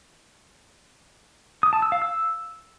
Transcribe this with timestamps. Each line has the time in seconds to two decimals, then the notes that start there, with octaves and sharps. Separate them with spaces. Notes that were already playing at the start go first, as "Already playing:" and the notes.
1.63 D#6
1.73 A5
1.82 E6
1.92 F5
2.02 E6